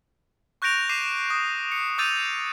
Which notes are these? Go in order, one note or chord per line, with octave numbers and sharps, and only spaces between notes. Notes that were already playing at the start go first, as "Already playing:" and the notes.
C#6 F#6 G6 A#6 D7 F7
D6 C7 D#7 E7
D#6
C#7
D6 E6 G6 A6 D#7 F7